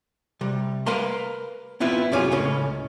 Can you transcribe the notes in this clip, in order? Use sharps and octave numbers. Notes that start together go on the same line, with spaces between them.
C3 G3
A#4 B4 F5 A#5 C6
B3 C4 E4 F4 B4
F#2 C3 C#4 F4 G#4
C#2 A2 C#3 C#4